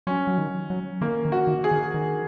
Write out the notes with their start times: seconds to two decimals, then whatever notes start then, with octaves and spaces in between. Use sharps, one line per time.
0.07 F#3 C#4
0.27 F#3
0.38 D#3
0.70 F#3
1.01 D#3 A#3
1.25 D#3
1.32 F#4
1.47 D#3
1.64 G#4
1.71 D#3
1.94 D#3